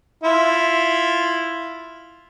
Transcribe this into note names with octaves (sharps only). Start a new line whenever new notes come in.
E4 F4